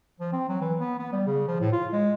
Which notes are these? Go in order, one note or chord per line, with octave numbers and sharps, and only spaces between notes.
F3
C4
F#3
E3
B3
B3
G3
C#3
F3
A2
F4
G#3